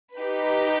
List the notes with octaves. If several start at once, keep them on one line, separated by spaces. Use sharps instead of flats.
D#4 G4 B4